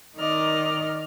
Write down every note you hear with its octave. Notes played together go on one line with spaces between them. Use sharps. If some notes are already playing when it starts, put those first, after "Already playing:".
D#3 D#4 D5 D#5 F6